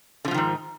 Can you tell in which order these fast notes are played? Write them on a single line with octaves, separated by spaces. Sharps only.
D3 F3 B2 D#3 G#2